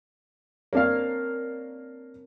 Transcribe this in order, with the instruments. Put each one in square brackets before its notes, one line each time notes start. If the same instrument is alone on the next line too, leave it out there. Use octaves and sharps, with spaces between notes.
[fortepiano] A#3 D4 F5 [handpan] C4 A#4 C#5